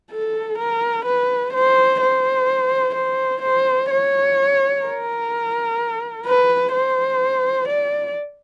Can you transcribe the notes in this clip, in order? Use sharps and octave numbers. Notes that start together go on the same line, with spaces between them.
A4
A#4
B4
C5
C5
C5
C5
C#5
A#4
B4
C5
D5